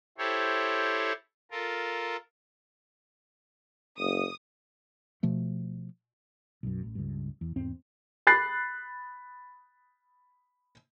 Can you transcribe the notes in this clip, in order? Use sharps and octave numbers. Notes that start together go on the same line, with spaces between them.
E4 G4 A4 C5 C#5
F4 A4 A#4
F#1 D#6
B2 F3 A3
B1 F#2
A1
C#2 G2
E2
E2 G#2 C4
B5 F#6 A6 C7